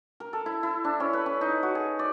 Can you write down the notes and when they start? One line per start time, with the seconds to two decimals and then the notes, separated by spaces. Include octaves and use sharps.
0.20 A#4
0.33 A4
0.46 E4
0.63 E4
0.84 D4
1.00 C#4
1.13 B4
1.26 C#4
1.41 D#4
1.63 F#4
1.75 G#4
1.99 D5